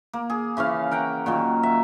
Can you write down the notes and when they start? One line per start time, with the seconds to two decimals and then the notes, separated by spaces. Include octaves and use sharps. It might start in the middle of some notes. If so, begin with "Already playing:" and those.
0.13 A#3
0.30 G#4
0.57 C#3 E3 C#4 F5
0.92 A#4 F#5 G5
1.26 A#2 D#3 F#3
1.63 E5